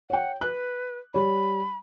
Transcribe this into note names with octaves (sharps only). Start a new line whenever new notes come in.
C#5 F#5 G5
B4 F#6
G3 C#5 B5